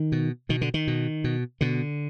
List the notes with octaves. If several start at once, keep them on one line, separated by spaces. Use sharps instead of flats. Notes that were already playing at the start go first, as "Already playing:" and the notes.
Already playing: D#3
B2
B2 D#3
D3
D#3
B2
B2
B2 D3